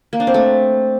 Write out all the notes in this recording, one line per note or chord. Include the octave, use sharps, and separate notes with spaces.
A#3
D4
C4
A3